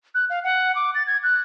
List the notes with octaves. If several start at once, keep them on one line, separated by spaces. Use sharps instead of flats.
F#6
F5
F#5
D6
A6
G#6
F#6